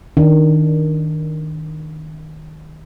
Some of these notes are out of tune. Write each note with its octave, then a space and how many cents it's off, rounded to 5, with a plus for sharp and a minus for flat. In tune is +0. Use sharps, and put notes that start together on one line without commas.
D#3 +0 D4 -5